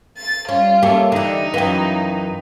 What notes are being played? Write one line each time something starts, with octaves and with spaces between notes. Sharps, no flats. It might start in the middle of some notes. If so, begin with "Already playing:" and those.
A6
G3 C#4 F4
A#3 C#4 G4 A4 E5
D3 E3 D#4
F#2 E3 B4 F5 G5